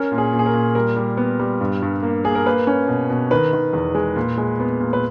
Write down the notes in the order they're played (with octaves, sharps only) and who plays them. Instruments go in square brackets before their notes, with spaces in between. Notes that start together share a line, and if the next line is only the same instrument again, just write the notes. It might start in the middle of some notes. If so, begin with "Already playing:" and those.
Already playing: [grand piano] C#4 A#4
A#2
G#4
A#2
G#4
A#4
A#2
G3 A#4
G3
B3
G3
G2
G2
A#3
A#3 G#4
A#4
A#3 B4
C#4
B2
B2
D#3 B4
D#3
E2
G#3
A#2
G#3
B3
A#2
B4